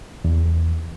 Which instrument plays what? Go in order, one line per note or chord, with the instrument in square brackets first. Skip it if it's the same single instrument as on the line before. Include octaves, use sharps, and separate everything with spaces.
[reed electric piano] E2